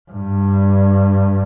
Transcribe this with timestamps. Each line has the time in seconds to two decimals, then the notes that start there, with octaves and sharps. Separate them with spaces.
0.11 G2